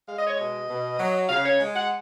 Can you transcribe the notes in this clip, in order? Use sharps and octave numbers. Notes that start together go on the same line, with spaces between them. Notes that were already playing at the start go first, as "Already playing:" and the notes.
G#3 F5
D#5
C#5
B2 D#5
B2
F#3
C#3 F5
C#5
G#3
F#5